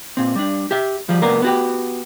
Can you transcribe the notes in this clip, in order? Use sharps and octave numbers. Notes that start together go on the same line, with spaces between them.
A#2 C4
G3 D4
G4 E5
F3 G3
C#2 F#2 A#3 B3 A#4 D5
B3 F#4 G4